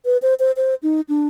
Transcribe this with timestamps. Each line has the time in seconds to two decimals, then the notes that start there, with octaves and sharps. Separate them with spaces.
0.05 B4
0.22 C5
0.40 C5
0.57 C5
0.83 D#4
1.09 D4